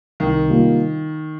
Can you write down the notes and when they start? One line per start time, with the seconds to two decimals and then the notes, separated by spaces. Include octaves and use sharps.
0.20 C2 D#3
0.48 C3 G3 A#3 F4